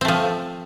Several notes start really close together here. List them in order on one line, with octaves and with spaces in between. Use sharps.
C4 A3 F3